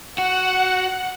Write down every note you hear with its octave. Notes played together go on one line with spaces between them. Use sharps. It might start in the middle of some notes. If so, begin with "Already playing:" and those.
F#4 F#5